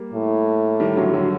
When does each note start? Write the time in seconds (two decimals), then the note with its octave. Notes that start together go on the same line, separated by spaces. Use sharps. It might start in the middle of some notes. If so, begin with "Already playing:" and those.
Already playing: G3 A#3
0.14 A2
0.80 D#3 G3
0.96 D3 F#3
1.14 D3 F#3